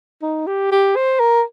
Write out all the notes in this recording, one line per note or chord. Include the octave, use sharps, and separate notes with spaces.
D#4
G4
G4
C5
A#4